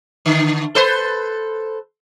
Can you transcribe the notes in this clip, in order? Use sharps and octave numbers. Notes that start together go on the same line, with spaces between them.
D3
A4 B4 C5